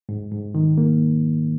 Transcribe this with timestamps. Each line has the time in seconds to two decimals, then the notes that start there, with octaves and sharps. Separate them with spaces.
0.09 G#2
0.32 G#2
0.55 D#3
0.78 A#3